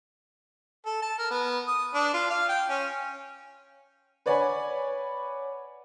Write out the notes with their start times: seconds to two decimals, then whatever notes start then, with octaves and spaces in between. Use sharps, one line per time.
0.86 A4
1.02 A5
1.18 A#4
1.30 B3
1.68 D#6
1.94 D4
2.14 F4
2.30 F5
2.49 G5
2.70 C#4
4.26 B4 C#5 D5 F#5 G#5 B5